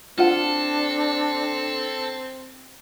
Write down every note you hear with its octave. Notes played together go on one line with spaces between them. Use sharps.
C4 D4 F4 A4 F#5